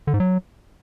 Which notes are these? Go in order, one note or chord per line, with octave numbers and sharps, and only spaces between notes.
D3
G#2
F#3